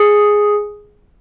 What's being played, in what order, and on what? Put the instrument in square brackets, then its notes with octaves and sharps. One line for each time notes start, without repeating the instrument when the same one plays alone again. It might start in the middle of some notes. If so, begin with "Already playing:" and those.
Already playing: [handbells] G#4